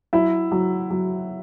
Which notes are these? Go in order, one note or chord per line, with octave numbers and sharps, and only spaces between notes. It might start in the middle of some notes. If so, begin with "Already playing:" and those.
F#3 E4 E5
F#3
F#3